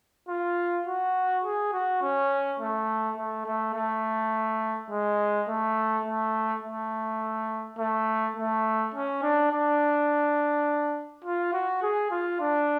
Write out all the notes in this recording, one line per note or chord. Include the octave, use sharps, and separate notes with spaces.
F4
F#4
G#4
F#4
C#4
A3
A3
A3
A3
G#3
A3
A3
A3
A3
A3
C#4
D4
D4
F4
F#4
G#4
F4
D4